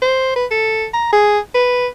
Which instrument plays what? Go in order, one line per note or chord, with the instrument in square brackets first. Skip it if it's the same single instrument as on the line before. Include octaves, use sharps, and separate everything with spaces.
[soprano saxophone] C5
B4
A4
A#5
G#4
B4